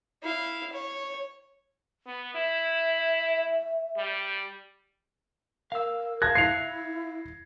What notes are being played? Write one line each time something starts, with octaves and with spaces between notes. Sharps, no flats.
E4 F5
C#5
B3
E4 E5
G3
A#4 F5 E6
E5 F5 A5 F#6 G#6 A#6
E4 C7 C#7 F7